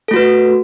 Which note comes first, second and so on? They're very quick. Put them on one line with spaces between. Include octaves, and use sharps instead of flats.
A4 A3 F#4 B4